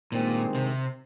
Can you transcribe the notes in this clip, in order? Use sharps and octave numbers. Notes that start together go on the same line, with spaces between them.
G2 A#2 D#3 G#3 C4
C3